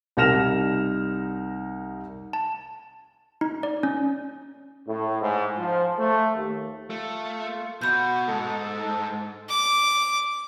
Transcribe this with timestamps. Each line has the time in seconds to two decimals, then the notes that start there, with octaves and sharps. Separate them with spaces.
0.17 C2 D#4 F6 A#6 E7 F7
2.33 A5
3.41 D#4
3.63 D5
3.83 C#4
4.87 A2
5.21 G#2
5.57 F3
5.98 A3
6.35 D#2
6.90 A3 F4
7.81 B2 F#4 B5 G6
8.28 G#2 A4
9.49 D6